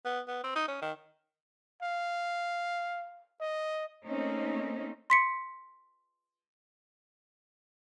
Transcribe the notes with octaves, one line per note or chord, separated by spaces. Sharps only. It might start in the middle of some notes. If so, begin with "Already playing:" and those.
B3
B3
C4
D#4
C#4
D#3
F5
D#5
A3 A#3 C4 C#4 D#4
C6 B6 C#7